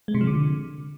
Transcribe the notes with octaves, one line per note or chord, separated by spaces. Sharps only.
G#3
C3
F3
D3